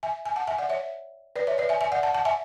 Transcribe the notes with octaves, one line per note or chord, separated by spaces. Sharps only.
E5 G#5
G#5
F#5 A5
E5 G#5
D5 F#5
C#5 E5
B4 D5
C#5 E5
B4 D5
E5 G#5
E5 G#5
D5 F#5
F#5 A5
F#5 A5
E5 G#5